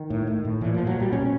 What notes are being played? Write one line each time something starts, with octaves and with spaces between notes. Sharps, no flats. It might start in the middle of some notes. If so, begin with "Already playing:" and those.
Already playing: D#3
A2
A2
A2
A#2 E3
A#2 F3
F#3
A#2 G3
B2 C#4